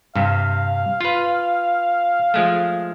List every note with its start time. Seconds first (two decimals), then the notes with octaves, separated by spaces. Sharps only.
0.16 G2 C3 F5
1.01 F4 B4
2.34 F3 G#3 A3